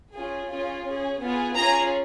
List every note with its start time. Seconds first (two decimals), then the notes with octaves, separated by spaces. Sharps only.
0.13 C#4 F4 G#4
0.50 C#4 F4 G#4
0.85 C#4 G#4
1.20 B3 F4 G#4
1.56 C#4 F4 G#4 A#5